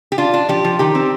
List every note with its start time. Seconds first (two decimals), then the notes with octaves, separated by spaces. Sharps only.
0.12 G4
0.18 D4 F4
0.34 D4
0.49 F3 G4
0.65 F3
0.79 D#3 G4
0.95 C4